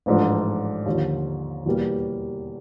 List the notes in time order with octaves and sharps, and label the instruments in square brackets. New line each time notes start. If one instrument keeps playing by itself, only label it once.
[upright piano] A1 G#2 F3 A3 D4
D#2 D3 F3
E2 B2 G3 A#3